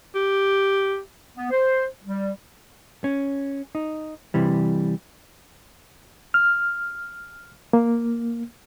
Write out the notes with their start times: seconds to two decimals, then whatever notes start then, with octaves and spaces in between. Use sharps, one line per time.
0.15 G4
1.36 B3
1.50 C5
2.04 G3
3.04 C#4
3.75 D#4
4.34 C3 E3 G3
6.34 F6
7.73 A#3